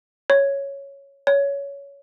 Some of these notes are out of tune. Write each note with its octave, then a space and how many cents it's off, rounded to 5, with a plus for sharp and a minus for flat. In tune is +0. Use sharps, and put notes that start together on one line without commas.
C#5 +0
C#5 +15